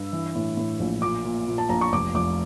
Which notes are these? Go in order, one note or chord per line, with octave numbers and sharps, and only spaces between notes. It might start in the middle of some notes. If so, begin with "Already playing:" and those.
Already playing: G2 E6
E3
A2
A2
A#1
A#2 D6
A#2
A#2
A5
A#1 A#5
C#6
F1 D6
F1 D6